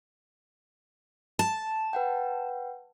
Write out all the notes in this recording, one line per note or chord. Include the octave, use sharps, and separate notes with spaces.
A5
B4 F#5 G5